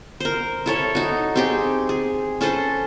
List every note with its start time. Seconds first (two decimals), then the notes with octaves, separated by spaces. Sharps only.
0.20 A#4 C5
0.66 E4 A4 C#5
0.95 D#4 F#4
1.35 C4 G4 G#4
1.89 G#4
2.41 C#4 A4 B4 C5